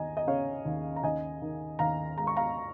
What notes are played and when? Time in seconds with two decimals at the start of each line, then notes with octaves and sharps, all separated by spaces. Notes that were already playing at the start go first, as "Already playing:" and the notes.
Already playing: D#2 D#5 G#5 A#5
0.17 D#5
0.27 C#3 C#5 F5
0.65 D#2
0.96 A#5
1.03 D#2 D#5 G#5
1.42 D#3
1.79 D#2 F5 A#5
2.17 G#3 A#5
2.27 C#6
2.37 F5 A#5